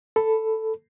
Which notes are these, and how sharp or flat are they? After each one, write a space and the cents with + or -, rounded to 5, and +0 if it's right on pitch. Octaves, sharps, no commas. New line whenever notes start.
A4 +5 B5 +0